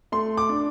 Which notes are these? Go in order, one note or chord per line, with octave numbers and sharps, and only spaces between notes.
A3 C6
D6
D4